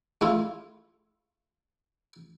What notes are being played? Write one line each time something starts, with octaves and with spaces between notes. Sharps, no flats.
A3 E4 F4